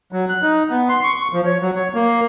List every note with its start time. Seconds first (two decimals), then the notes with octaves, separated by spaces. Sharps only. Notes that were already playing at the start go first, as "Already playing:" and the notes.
0.12 F#3
0.29 F#6
0.42 D#4
0.70 B3
0.89 C6
1.03 C#6
1.16 C#6
1.33 F3
1.46 C#5
1.62 F#3
1.75 C#5
1.95 A#3